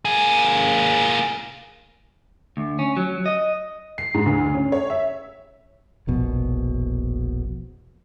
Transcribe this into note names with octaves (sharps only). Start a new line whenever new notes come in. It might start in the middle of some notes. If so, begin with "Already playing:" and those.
A#3 G#4
D2
C#4
F#3
D#5
C7
G#2
D2
C#4
C#5
E5
E1 A#1 B2